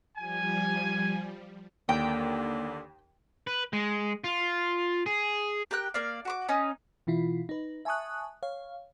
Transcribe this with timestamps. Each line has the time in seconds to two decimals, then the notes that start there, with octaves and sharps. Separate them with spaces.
0.17 F3 G3 G#5
1.89 D#2 D3 A#3 G5
3.47 B4
3.73 G#3
4.24 F4
5.06 G#4
5.71 G4 A#4 G5 F#6
5.94 A#3 D5 F5
6.25 F#4 C#6 D6
6.48 C#4 D#4 D#6
7.07 B2 E3 E4 F4
7.49 D#4 B4
7.85 E5 G#5 A5 C#6 D#6 F#6
8.43 C#5 F5